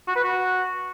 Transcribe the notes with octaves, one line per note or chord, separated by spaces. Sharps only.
F#4
B4
F#4